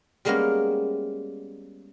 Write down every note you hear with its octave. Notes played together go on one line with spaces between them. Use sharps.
G3 G#3 A#3 B3 C#4 A#4